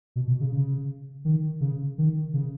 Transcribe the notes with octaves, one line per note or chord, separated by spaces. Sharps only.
B2
B2
C#3
C#3
D#3
C#3
D#3
C#3